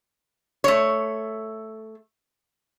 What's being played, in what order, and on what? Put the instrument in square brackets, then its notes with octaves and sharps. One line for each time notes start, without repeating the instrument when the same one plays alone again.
[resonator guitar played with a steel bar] A3 C#5